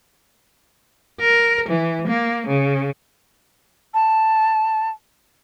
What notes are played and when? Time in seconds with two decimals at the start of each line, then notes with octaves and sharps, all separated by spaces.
1.21 A#4
1.69 E3
2.07 A#3
2.47 C#3
3.94 A5